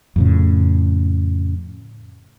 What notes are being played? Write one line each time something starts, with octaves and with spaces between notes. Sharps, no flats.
F2 A2 C#3